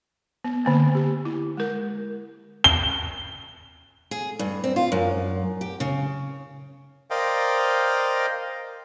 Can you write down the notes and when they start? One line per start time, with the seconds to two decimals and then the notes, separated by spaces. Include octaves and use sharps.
0.44 B3
0.65 D3 A#3 C4
0.95 G4
1.25 E4
1.57 G#3 A#4
2.64 G7
4.11 G#4
4.39 G2
4.64 C4
4.76 F4
4.92 F#2
5.61 G4
5.80 C#3
7.10 A#4 C5 D5 D#5 F5 G5